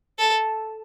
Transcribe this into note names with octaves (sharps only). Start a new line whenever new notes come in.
A4